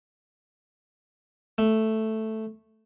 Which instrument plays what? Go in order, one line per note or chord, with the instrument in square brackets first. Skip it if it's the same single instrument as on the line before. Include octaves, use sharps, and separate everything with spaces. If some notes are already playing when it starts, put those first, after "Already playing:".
[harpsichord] A3